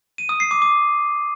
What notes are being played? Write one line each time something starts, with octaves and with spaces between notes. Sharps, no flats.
D#7
D#6
C7
D6
D6